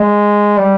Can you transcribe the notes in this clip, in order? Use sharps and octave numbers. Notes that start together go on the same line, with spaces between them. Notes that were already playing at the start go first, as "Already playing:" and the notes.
Already playing: G#3
G3